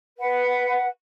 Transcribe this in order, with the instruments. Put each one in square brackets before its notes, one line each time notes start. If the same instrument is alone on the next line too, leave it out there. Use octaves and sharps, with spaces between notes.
[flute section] B4 F#5